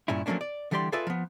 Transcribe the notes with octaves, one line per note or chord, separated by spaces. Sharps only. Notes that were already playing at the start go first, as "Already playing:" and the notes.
G2 A#2 C#4 E4
F3 F#3 A3 A#3 C#4 D4
D5
D3 E3 G3 G4 D5 C6
F4 G#4 A4 B4 D5 E5
F3 B3